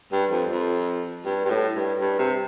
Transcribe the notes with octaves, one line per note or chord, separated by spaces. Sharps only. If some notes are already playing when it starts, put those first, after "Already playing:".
G2
F2
F2
G2
G2
A2
G2
G2
C3